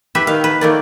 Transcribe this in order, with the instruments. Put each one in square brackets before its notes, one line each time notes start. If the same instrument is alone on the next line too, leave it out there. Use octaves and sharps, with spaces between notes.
[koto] G4 B4 E5
[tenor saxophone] D#3 [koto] F5
[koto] B4
[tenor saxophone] D#3 [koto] A3 A#3 D5